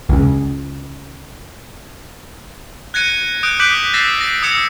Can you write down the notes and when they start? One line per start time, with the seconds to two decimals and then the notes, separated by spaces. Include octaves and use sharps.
0.09 C#2 C#3
2.94 F#6 G#6 A#6 C#7 D#7
3.43 D#6 F#6 G6 D7
3.60 D6 F#6 G6 B6 D7 F#7
3.94 E6 A6 A#6 C7 E7
4.21 A#6 D7
4.43 D#6 E6 G#6 C#7 E7